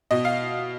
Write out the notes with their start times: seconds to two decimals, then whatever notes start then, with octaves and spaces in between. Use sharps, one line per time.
0.11 B2 D#5
0.25 F5